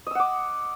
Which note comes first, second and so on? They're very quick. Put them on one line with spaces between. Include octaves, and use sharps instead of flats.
D#5 E6 F#5 D6